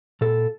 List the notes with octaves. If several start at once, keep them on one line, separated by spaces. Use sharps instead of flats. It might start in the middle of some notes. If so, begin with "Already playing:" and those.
A#2 A4